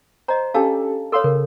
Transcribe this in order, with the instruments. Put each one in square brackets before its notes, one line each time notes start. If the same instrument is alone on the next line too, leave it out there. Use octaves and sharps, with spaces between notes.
[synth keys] C5 [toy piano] D#5 A#5
[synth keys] C#4 G4 A4 [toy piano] D4 F5 A5
[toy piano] A4 C#5 [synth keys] F5 C6 E6
[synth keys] C#3 [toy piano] A#4